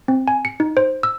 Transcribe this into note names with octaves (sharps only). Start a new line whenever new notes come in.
C4
G#5
C#7
D#4
C5
E6